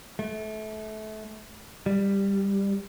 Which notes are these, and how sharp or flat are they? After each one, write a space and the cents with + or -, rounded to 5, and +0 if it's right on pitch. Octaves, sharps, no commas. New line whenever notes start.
A3 -25
G3 +10